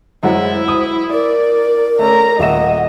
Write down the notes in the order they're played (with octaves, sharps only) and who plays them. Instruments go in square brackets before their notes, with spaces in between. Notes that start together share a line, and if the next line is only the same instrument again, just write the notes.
[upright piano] F#2 G#3 F#5 [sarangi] E4 [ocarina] C5
[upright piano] D#6
[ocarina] A#4 [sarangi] D5
[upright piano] A3 C#4 [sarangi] A#5
[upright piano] D#1 E5 E7 [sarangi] D#5 [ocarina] F#5